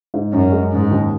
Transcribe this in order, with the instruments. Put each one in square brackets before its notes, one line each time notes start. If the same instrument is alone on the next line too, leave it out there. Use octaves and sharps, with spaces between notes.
[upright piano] G#2
[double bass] F#2 [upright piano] C#4
[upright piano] G#3
[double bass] G#2 [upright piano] C#3
[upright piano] D#2